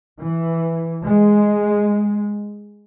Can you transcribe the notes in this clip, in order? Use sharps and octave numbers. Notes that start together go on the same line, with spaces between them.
E3
G#3